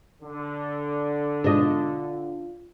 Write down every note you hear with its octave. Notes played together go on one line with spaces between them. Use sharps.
D3
G#2 B2 D4 F4 D#5